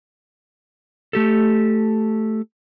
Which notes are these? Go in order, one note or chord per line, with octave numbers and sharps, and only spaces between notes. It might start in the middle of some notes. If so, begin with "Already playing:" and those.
A3 G4 A4